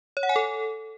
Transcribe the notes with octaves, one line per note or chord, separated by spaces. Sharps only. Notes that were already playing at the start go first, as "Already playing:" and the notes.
C#5
F#5
G#5
A4